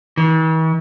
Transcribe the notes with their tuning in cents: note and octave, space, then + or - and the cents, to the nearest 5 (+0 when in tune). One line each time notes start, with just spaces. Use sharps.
E3 -45